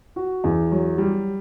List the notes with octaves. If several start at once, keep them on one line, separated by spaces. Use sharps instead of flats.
F#4
E2
F#3
G3